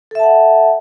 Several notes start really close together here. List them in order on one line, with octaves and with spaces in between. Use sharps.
A4 E5 A5 F#5